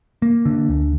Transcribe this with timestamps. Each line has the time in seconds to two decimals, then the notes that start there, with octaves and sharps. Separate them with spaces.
0.22 A#3
0.45 D3
0.69 D2